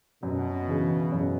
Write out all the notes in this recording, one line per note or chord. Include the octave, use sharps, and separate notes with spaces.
F#2 B2
C#3 E3
F#2